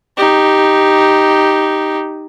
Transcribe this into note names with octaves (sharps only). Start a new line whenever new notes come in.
D#4 G4